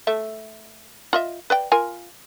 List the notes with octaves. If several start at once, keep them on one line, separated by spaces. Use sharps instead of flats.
A3 A4 E5
F4 D#5 E5
B4 D5 G5
F4 A#4 G#5